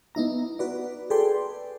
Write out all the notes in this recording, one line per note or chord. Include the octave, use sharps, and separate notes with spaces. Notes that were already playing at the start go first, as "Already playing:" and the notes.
B3 D#4 E4 A#5
F#4 B4 D5
G#4 A4 B4 D5 G5 C6